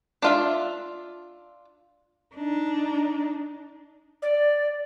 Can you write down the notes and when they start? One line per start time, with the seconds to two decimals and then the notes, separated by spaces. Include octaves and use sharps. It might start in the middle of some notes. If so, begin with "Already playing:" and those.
0.22 D4 F4 E5
2.35 D4 D#4
4.22 D5